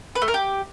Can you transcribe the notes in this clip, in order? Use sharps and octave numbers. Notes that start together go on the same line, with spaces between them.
B4
A3
A#4
G4